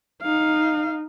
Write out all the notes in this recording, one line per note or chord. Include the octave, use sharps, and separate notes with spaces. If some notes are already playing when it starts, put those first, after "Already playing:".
D#4 F5